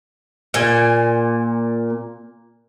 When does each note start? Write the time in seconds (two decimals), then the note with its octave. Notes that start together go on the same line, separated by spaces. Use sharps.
0.54 A#2 G#5